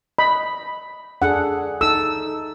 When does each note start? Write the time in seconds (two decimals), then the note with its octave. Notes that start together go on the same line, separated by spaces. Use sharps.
0.19 D#5 B5
1.22 D4 G#4 A4 F#5
1.81 D#4 A4 E6